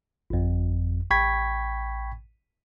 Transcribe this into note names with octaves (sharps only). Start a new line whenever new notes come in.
G1 F2
A1 G5 B5 C#6 G#6 B6